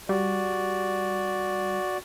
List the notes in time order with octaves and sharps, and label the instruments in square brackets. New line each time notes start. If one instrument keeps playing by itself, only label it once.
[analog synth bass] G3 [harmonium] F#4 D5